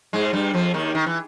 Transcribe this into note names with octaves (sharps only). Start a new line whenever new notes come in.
G#2 G#3
G2 G3
F2 F3
D#2 D#3
D#3
E3